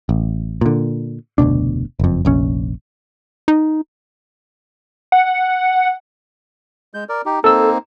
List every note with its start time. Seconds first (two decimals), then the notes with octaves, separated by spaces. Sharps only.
0.09 A1
0.61 A#2 D3
1.38 F1 D2 B2 D4
1.99 F#1 F2
2.25 F1 A#1 C#4
3.48 D#4
5.12 F#5
6.94 G#3 G6
7.09 A#4 D5
7.26 D#4 G4
7.44 A#3 C4 D#4 A4 E6